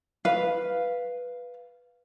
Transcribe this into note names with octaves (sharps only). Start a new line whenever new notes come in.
B4 F5